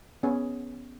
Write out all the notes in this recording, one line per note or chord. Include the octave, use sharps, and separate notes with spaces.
B3 C#4 G#4